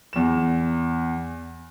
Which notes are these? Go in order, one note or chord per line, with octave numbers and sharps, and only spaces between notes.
E2 E7